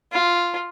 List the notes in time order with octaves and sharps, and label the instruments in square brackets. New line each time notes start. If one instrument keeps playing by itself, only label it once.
[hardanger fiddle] F4